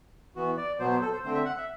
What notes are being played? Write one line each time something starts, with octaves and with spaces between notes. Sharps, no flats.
E3 B3 F#4
D5
B2 F#3 B3 C5
C5
A4
C5
D3 A3 C4 C5
E5
F#5
E5